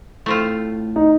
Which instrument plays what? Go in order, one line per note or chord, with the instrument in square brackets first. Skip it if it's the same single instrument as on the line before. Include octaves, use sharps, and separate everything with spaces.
[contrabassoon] A2 [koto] A3 C4 F4
[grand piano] D#4